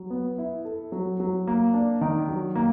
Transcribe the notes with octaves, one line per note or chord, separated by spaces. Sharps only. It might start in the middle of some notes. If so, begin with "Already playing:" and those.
Already playing: F#3
B3
E4
A4
F#3
F#3
A#3
D4
D#3
F#3
A#3